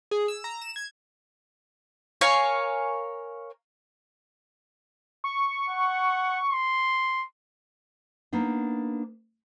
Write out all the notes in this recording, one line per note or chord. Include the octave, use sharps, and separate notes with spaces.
G#4
E6
A#5
E7
G#6
A#4 C#5 F5 G#5
C#6
F#5
C6
A#3 B3 D4 D#4